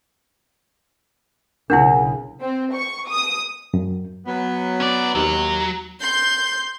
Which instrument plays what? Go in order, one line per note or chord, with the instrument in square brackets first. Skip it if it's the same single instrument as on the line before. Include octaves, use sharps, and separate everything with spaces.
[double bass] B1 C#3 [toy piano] D4 E4 [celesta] A#4 F#5 G#5
[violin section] C4
C#6
D#6
[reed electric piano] F#2
[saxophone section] F#3 B3
[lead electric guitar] C#4 D5
[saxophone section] D#2 [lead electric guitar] F#3
[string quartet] C6 G6